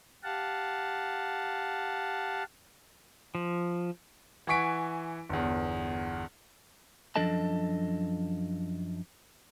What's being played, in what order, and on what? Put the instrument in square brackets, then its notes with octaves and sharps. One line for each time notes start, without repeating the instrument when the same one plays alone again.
[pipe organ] G4 F5 F#5 A5
[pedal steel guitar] F3
[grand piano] E3 F#5 G#5 C#6 B6 D7
G1 E2
[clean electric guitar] F#2 F3 D4 A4 D#5 A5